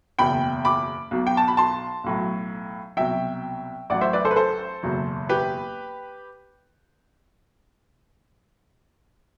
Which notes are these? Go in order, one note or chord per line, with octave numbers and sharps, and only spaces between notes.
F#1 E2 B2 G5 B5
B5 D6
B1 B2 F#3
G5
A5
B5
A5 C6
B1 A2 F#3
C2 B2 F#3 E5 G5
A1 A2 F#3 D5 F#5
C5 E5
B4 D5
A4 C5
B4
A4 C5
F#1 E2 B2 F#3
G4 B4